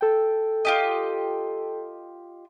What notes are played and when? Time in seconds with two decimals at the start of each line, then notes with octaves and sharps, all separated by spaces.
0.01 A4 G5
0.65 F4 G4 D#5